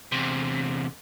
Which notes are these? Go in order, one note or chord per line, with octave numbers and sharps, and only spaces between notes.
E2 C3